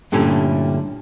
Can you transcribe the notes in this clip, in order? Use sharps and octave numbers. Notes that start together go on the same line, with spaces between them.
G2 A#2 D3 A3 C#4 E4